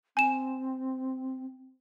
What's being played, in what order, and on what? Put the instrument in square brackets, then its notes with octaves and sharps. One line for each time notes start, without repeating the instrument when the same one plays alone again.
[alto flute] C4 [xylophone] G#5 E7